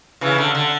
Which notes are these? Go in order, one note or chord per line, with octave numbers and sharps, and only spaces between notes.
C#3 E3
D3
D3